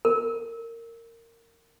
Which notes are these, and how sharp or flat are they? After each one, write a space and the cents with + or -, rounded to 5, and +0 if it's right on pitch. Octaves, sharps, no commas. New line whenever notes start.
A#4 -20